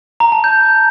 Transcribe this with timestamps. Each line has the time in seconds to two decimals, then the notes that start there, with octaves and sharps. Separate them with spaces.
0.20 A#5
0.32 A5
0.44 G6